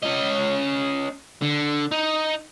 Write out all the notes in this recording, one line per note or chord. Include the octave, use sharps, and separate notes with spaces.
C#4 D#5
D3
D#4